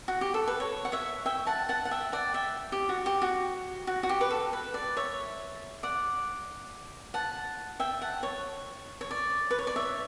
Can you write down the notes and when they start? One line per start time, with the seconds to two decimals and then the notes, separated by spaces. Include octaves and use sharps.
0.08 F#4
0.21 G4
0.34 A4
0.47 B4
0.60 C#5
0.85 F#5
0.92 C#5 E5
1.26 E5 G5
1.47 F#5 A5
1.69 F#5 A5
1.85 F#5
1.91 E5 G5
2.12 D5 F#5
2.34 E5 G5
2.72 G4
2.89 F#4
3.06 G4
3.22 F#4
3.87 F#4
4.03 F#4
4.09 G4
4.21 B4
4.30 A4
4.53 B4
4.74 D5
4.97 C#5 E5
5.83 D5 F#5
7.14 F#5 A5
7.80 E5 G5
8.02 F#5 A5
8.23 C#5
9.01 C#5
9.11 D5
9.51 B4
9.59 C#5
9.67 D5
9.76 C#5 E5